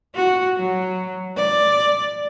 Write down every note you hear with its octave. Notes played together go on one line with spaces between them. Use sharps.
F#4
F#3
D5